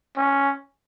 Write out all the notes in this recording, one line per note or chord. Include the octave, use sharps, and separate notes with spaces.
C#4